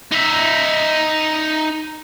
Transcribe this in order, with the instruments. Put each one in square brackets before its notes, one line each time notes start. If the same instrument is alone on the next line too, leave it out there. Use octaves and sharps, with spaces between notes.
[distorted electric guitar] D#4 E5